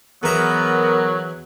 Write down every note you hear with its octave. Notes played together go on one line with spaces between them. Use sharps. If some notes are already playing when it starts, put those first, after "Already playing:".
E2 F#3 B3 A#4 E5 A#5